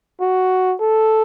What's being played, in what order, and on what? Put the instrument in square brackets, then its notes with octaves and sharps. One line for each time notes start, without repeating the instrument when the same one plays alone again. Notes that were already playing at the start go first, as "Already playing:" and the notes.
[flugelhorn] F#4
A4